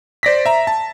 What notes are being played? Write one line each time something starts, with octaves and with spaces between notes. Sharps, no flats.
C5 D5 A#6 B6
E5 A#5
A5